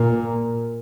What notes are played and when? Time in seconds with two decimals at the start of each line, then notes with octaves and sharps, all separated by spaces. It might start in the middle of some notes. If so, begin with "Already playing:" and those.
Already playing: A#2